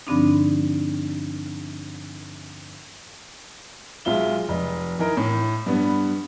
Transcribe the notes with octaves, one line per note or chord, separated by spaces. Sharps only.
G2 D3 F3 C4 D4 D#4
B1 G#3 F4 E5 G7
F1 D#5
E3 D#4 A#4
A2
G2 B3